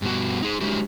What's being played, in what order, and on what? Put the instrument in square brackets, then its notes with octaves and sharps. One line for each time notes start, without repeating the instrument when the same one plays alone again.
[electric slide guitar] G2 B2 F#4
D#4 G#4
G#3 D4 E4 F#4 G4